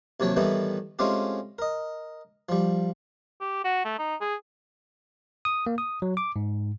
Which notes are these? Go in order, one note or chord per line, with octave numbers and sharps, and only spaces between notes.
D#2 C3 F#3 C#5 G5 A5
A2 D#3 E3 G3 A3 B3
G#3 A3 C4 C#4 F4 G4
A#4 D#5
F3 G3
G4
F#4
A3
D#4
G#4
D#6
A#3
D#6
F#3
D6
G#2